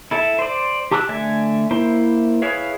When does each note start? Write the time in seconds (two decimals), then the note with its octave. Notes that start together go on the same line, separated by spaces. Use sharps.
0.11 E4 A4 E5
0.39 C5 D5
0.91 G4 A5 D6 E6 F#6
1.09 D3 A3 D5 E5 G#5
1.71 A#3 E4 C5
2.42 E4 G#4 B4 C#5 F5